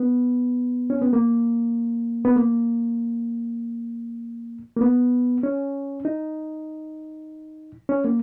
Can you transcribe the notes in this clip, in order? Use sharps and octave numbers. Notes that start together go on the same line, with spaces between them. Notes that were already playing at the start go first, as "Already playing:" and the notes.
Already playing: B3
C#4
B3
A#3
B3
A#3
A#3
B3
C#4
D#4
C#4
A#3